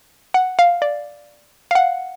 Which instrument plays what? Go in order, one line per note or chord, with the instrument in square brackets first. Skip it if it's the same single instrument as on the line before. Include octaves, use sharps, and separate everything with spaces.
[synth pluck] F#5
F5
D5
F5
F#5